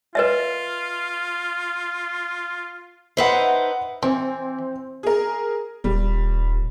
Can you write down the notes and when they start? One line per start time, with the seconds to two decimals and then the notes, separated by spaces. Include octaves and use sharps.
0.15 F4 B4 D#5 E5
3.17 D#4 B4 C5 E5 F#5
4.03 E3 C4
5.03 G#4 A#4
5.84 D#1 G3